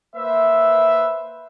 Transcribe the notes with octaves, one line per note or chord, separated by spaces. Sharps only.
A#3 B4 C5 E5